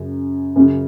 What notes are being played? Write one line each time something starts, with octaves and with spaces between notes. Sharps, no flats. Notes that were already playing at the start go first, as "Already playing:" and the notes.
Already playing: F#2 C#3
F#2 C#3